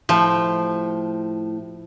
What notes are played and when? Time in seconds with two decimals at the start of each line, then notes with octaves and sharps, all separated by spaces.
0.09 A2 F3 G4 G5